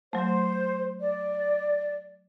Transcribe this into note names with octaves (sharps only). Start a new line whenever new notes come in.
F#3 A3 C5
D5